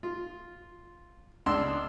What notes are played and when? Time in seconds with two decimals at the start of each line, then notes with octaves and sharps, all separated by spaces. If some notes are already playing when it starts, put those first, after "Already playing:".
0.03 F4
1.46 C#2 D4 C6 E6